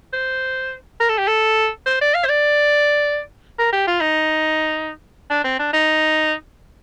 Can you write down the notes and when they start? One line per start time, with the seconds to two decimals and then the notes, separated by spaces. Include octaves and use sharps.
0.13 C5
1.00 A#4
1.09 A4
1.18 G4
1.27 A4
1.86 C5
2.01 D5
2.14 F5
2.25 C5
2.29 D5
3.59 A#4
3.72 G4
3.87 F4
4.00 D#4
5.30 D4
5.44 C4
5.59 D4
5.73 D#4